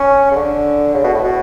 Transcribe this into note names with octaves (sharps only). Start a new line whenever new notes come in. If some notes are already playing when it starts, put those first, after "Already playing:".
Already playing: C#4
C#3
D3
C#3
B2
A2
B2